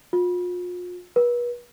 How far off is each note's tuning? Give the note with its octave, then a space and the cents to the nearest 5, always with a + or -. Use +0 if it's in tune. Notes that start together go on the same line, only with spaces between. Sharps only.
F4 +40
B4 -40